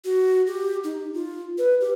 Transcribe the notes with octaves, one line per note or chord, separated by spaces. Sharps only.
F#4
G4
D#4
F4
B4
G4